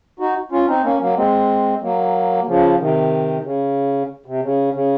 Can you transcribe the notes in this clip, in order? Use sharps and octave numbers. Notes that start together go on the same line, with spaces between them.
D#4 F#4
C#4 F4
C4 D#4
A#3 C#4
F#3 A#3
G#3 C4
F#3 A#3
C#3 F3
C3 D#3
C#3
C3
C#3
C#3